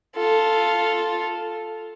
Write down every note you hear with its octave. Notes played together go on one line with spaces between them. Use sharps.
F4 A4